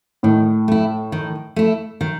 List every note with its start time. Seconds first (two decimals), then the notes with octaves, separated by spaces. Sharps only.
0.23 A2 D#3
0.68 A3 E4
1.12 D#3
1.56 A3 E4
2.01 D#3